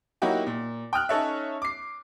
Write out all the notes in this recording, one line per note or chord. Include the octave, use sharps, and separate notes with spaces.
F#3 A#3 D#4 E4 F#4 G4
A#2
G5 D#6 F6 F#6
C#4 D#4 A4 C#5 E5
D6 C7